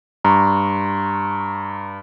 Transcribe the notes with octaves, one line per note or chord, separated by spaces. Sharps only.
G2 A#5 C6 C#6